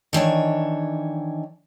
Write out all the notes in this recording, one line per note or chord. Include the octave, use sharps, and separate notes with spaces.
D#3 E3 D4 C#5